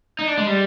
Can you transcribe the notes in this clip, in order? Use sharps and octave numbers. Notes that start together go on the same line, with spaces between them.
D#4
D4
G#3
G3